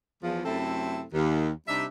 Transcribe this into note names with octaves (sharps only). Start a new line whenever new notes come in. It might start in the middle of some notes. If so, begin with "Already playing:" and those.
E2 F3
F#2 C3 A3 C4 E4 A4
D#2
C3 G3 D4 D#4 E5